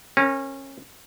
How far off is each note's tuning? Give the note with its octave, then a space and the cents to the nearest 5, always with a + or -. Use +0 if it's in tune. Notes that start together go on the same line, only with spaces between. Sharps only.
C#4 -25 A#4 +0